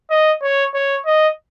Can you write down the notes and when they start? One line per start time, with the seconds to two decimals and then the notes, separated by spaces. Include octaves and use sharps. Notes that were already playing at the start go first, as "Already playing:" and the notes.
0.10 D#5
0.42 C#5
0.74 C#5
1.06 D#5